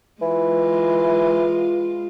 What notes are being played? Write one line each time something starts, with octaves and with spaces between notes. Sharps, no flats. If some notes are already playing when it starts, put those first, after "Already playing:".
E3 G#3 F4